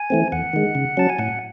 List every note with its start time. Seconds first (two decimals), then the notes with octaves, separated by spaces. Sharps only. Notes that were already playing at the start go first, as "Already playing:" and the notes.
Already playing: G#5
0.10 E3 A3 C4
0.32 E2 F#5
0.53 D#3 G#3
0.75 C#3
0.97 F#3 C#4 A5
1.10 G#5
1.19 A2 F#5